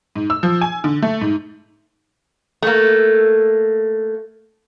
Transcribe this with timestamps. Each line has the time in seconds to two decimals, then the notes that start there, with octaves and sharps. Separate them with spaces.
0.16 G#2
0.30 E6
0.43 F3
0.61 G#5
0.84 D3
1.02 A3
1.21 G#2
2.62 A3 A#3